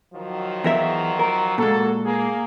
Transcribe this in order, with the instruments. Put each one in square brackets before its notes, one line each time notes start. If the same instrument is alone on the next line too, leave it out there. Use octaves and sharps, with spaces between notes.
[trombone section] D#3 F3 F#3
[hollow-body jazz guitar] E2 A#4 E5
A#4
[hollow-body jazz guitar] A#2 G#3 [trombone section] A#3 F#4 A4
[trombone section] A#3 G#4